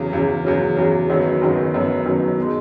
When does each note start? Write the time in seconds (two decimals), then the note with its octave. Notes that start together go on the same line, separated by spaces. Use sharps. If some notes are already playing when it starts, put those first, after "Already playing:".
Already playing: E2 C#3 F#3
0.13 E2 C#3 F#3
0.45 E2 C#3 F#3
0.77 E2 C#3 F#3
1.10 F#1 F#2 D#3 F#3 B3
1.41 F#1 F#2 D#3 F#3 B3
1.73 F#1 F#2 D#3 F#3 B3
2.05 F#1 F#2 D#3 F#3 B3
2.38 B2 G#3 D#4